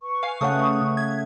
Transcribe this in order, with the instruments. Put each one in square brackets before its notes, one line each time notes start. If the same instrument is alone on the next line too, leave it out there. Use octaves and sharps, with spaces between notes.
[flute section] B4 C#6
[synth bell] F5 G#5
[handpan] C#3 C#5 F#5 [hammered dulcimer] A3 [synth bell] D#6
[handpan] C#3
[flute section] E5 [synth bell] G#6